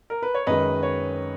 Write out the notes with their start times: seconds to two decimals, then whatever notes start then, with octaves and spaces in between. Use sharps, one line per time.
0.10 A#4
0.23 B4
0.35 C#5
0.47 F#2 D#3 G#3 B4 D#5
0.83 C#5